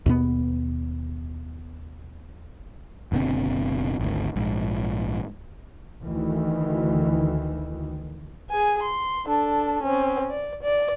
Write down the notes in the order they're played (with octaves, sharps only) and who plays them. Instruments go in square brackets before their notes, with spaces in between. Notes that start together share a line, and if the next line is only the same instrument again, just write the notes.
[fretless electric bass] D#2 B2 B3
[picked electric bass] F#1 B2 D3 C4
G#1 D2
A#1 G#2
[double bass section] D2 D#3 E3
[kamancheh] G#4 G#5
C6
D4 A4
C4 C#4
D5
D5